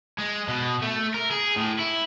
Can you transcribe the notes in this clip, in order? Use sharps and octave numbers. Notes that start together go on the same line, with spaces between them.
G#3
B2
A3
A#4
G#4
A2
E4